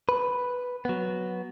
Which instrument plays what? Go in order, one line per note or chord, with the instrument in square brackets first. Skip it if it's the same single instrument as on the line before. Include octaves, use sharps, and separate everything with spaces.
[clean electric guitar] B4
F#3 B3